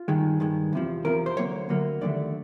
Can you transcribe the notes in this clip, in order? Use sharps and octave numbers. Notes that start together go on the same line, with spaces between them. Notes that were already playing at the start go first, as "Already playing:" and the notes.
Already playing: F4
G2 D#3 G#3
G2 D#3 G#3
E2 C3 F3
E2 C3 F3 A#4
C5
D2 D3 F#3 A#3 C#5
D2 D3 F#3 A#3
D#2 D3 F3 A3 D5